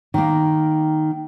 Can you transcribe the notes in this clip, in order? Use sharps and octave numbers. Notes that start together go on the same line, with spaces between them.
D#3 A#3